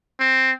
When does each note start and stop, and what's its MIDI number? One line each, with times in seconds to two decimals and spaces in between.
0.19 0.52 60